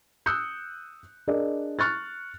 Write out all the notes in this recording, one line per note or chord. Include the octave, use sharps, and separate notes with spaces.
D#6 E6 F#6 G6 C#7
D4 G#4 A#4 D5 D#5
C#6 F6 F#6 A6